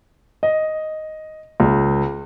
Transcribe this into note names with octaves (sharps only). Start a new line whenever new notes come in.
D#5
C#2